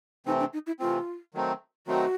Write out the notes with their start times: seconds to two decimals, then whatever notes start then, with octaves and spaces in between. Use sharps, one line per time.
0.26 C3 E3 A3 C4 D#4
0.40 D4
0.53 D#4
0.67 E4
0.80 C3 E3 A3 C4 F4
1.34 D#3 F#3 A3 C4 D#4
1.87 D#3 F#3 A3 C4 D#4 F#4